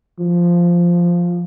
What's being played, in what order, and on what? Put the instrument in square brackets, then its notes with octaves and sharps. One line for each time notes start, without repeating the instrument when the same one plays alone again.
[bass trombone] F3